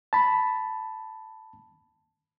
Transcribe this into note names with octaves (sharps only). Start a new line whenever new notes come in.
A5 B5